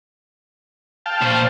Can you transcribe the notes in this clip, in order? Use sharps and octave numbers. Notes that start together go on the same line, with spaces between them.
F5 G5 A5
A#2 C5